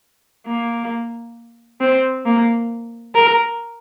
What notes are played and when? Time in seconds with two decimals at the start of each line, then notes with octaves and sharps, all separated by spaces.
0.46 A#3
1.81 C4
2.25 A#3
3.15 A#4